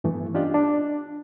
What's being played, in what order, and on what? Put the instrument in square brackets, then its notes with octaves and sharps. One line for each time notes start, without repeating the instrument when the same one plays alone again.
[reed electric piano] G2 E3 A3 B3
C#4 D4 F4 G4 D5 D#5
D4